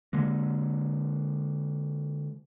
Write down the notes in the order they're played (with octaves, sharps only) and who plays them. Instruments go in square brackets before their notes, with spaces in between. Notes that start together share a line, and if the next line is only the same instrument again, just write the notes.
[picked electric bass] D3 G#3 A#3